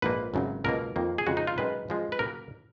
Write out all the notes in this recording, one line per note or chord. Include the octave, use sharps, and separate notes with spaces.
A#1 G#2 F3 A#3 B4
G#1 F#2 C#3 F#3
C#2 B2 F#3 A#3 A#4
F2 D#3 A#3
G#4
F2 C#3 G#3 F#4
D#4
F4
F#2 D#3 G#3 B4
F#2 F3 G#3
B4
C#3 F#3 A#3 A#4